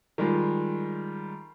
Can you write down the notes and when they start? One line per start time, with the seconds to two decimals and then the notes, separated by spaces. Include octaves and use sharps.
0.18 D#3 G3 G#3 F4